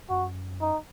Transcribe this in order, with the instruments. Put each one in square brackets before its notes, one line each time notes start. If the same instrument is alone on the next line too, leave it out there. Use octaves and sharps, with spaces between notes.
[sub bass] F#2 [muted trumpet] F#4
[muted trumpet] D#4